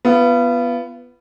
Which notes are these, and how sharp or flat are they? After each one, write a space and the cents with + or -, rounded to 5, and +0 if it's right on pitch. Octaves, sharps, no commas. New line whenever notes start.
B3 +0 F4 -35